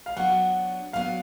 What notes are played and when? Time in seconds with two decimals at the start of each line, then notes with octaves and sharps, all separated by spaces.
0.06 F5
0.17 F#3 B3 D4 F#5
0.93 F#3 B3 D4 F5